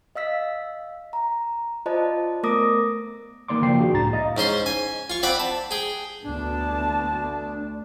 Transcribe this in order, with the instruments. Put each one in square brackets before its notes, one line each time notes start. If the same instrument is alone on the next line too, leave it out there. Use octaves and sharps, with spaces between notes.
[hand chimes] D#5 F5 E6 B6
A#5
F4 C5 D5 D#5 A5
A3 B3 A#4 D6 D#6 A#6
[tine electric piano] D#3 A#3 D5 C6 D6
C#3 F3 A#3 G5 C7
D4 F#4 G#4
C#2 A2 A#5 A6
D#5 F5 A#5
[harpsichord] G#2 C#4 C5 C6
G#5
F4 C#6
C4 D5 F#5 B5
A5
G#4 G5
[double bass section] D2 [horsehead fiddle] B3 A5 [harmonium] D4